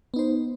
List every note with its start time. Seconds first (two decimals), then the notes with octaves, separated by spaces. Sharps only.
0.14 B3
0.16 D#4
0.19 C5